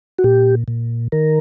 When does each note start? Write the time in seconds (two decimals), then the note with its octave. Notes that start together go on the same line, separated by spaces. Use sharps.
0.19 F#4
0.24 A#2 G4
0.68 A#2
1.12 D#3 A#4